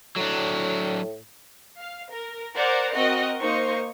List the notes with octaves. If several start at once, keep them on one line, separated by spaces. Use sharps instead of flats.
A2 F#3 D4
F5
A#4
A#4 C5 D5 F#5 A#5
C4 F#4 A#4 D#5
A#3 D#4 C5 C#6